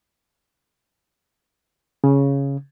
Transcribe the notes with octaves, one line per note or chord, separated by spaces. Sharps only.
C#3